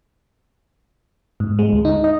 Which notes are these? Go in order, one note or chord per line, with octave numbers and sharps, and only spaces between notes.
G#2
G#3
D2
D#4
D#5